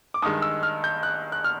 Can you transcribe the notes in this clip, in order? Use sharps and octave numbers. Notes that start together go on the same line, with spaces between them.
D6
G2 D#3 G#3 D#6
E6
F6
G6
F#6
F#6
F6